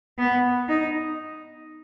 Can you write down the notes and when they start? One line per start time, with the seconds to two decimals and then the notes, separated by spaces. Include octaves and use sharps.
0.18 B3
0.68 D#4